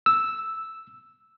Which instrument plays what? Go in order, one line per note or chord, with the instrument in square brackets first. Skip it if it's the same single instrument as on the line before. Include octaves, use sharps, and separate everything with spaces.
[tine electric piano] E6